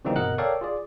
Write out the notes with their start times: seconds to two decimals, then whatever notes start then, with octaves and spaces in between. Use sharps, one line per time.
0.05 C#3 E3 G3 A#3 C4 D#4
0.16 G1 B2 A#4 D#5 F#5 F#6
0.38 A4 A#4 C#5 D5 F5 G5
0.61 F4 G#4 D5